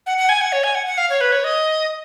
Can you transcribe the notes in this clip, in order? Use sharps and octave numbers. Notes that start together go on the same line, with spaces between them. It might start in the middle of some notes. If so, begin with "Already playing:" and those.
F#5
F#5
G#5
F#5
C#5
G#5
F#5
F#5
F5
C#5
B4
C#5
D#5